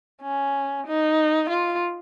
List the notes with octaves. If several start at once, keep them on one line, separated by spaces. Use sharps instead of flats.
C#4
D#4
F4